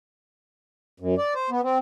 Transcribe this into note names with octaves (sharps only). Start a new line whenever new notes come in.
F#2
D5
C5
B3
C4